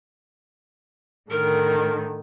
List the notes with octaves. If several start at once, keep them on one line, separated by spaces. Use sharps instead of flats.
A2 D3 D#3 A#4